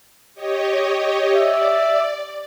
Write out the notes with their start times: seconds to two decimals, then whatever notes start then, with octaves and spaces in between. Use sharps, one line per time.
0.35 G4 C#5 D#5
1.36 D5 E5